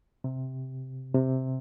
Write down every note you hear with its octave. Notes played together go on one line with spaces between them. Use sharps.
C3
C3